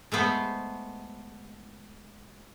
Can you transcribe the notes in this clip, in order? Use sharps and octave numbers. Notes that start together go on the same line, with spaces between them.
G#3 A3 B3 C5